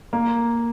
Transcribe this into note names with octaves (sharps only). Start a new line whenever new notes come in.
A#3